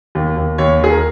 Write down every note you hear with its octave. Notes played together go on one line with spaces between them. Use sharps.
D#2
D#2
D#2 C#5
D#3 G#4
A#4